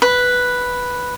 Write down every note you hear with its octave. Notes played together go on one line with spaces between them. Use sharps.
B4